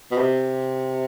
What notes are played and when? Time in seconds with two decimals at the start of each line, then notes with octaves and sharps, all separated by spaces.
0.12 B2
0.17 C3